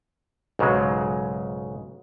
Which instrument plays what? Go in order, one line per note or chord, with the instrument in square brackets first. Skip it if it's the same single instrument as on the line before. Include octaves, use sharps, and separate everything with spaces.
[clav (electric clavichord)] B1 G#2 C#3 F#3 G#3